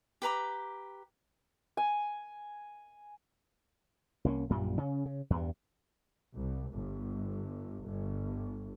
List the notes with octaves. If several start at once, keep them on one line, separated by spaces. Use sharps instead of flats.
G4 B4 A#5 D6
G#5
C2 A#3 C#4
A#1 F#2 A#2 G3
C#3 C#4
C#3
E2 G2
C2
G1
G1